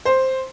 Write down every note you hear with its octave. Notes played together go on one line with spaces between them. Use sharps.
C5